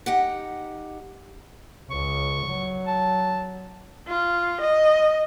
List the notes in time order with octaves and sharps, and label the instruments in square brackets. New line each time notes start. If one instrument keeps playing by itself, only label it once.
[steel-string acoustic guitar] D#4 G4 F#5
[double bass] C#2 [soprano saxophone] C#6
[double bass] F#3
[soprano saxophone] A5
[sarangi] F4
D#5